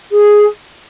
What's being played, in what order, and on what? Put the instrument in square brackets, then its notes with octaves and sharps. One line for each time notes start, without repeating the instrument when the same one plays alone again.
[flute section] G#4